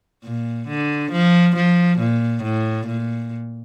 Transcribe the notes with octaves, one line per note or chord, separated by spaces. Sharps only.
A#2
D3
F3
F3
A#2
A2
A#2